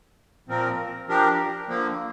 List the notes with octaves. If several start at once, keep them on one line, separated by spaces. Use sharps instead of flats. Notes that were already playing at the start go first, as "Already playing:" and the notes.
A#2 F3 C4 A#4
F3 D4 G4 A#4
D3 F3 A#3